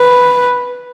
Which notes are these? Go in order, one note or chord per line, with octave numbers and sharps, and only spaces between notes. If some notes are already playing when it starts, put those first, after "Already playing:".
Already playing: B4